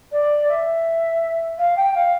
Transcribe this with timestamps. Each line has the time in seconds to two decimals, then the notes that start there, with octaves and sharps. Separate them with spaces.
0.12 D5
0.49 E5
1.58 F5
1.77 G5
1.95 F5